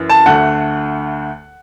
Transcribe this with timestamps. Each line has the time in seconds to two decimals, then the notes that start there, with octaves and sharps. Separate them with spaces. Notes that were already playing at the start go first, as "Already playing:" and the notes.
Already playing: F#2 E3
0.09 A5
0.26 D2 D3 A3 F#5